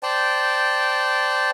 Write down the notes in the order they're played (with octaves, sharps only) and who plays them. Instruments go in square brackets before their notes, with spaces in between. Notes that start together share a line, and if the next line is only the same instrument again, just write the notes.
[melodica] C5 D5 G5 A5